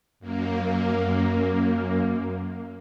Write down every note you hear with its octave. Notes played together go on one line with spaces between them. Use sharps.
F#2 A#3